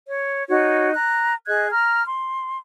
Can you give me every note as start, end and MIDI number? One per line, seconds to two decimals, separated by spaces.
0.08 0.47 73
0.49 0.93 63
0.49 0.93 66
0.49 0.93 73
0.93 1.34 82
0.93 1.34 90
1.47 1.69 68
1.47 1.69 75
1.47 1.69 90
1.47 1.69 92
1.71 2.03 82
1.71 2.03 89
2.05 2.57 84